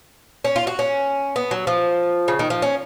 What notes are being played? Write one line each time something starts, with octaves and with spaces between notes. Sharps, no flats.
C#4
F4
F#4
C#4
B3
F#3
F3
C#3
D#3
F3
C#4